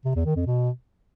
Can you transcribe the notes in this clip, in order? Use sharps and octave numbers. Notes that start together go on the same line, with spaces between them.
C3
E2
D#3
F2
B2